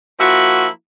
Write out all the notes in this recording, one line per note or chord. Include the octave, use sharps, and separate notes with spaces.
F3 A#3 E4 F#4